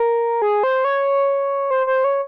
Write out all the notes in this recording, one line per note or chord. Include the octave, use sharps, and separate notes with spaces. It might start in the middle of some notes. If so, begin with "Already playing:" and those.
Already playing: A#4
G#4
C5
C#5
C5
C5
C#5